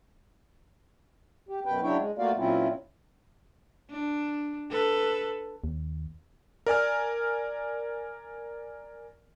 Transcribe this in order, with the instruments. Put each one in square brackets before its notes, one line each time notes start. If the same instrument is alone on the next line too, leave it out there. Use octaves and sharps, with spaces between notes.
[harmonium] G4
F#2 B2 B4 G5
C#3 F#3 D4 E4 C#5 G5
G#3
A3 A#3 F4 F#4 D5 F5
A#2 F#3 C4 C#4 E4 F4
[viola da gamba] D4
A4 B4
[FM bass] D#2
[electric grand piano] A#4 D5 G#5 F6